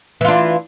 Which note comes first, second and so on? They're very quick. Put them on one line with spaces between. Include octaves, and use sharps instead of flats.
E3 F4 D4